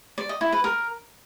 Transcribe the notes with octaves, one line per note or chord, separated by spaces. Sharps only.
D5
D#5
E4
B4
A#4